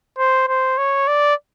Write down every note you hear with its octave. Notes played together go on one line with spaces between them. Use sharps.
C5
C5
C#5
D5